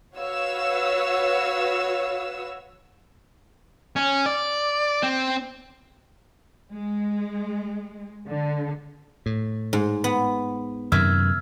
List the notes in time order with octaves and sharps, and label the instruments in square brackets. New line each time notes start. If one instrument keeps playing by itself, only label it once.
[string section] F#4 B4 C#5 F5 E6
[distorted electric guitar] C#4
D5
C4
[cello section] G#3
D3
[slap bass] A2
[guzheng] G#2
B3
[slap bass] F#2 C3 D#3 [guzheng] E5 [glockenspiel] E6 F6 G#6